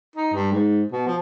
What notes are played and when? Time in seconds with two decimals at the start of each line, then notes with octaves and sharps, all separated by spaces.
0.16 D#4
0.33 G2
0.52 G#2
0.92 B2
1.07 F3